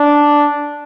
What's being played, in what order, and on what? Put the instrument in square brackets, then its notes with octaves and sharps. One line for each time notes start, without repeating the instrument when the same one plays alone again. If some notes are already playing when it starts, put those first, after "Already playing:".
Already playing: [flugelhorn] D4